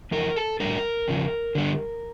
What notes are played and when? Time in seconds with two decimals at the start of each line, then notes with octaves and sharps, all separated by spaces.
0.11 F2 E3 A#4
0.36 A4
0.60 A2 G3 D4 A#4
1.08 E2 C#3 F3
1.55 D3 G3 D4